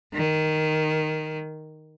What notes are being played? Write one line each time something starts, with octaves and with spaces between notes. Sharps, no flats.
D#3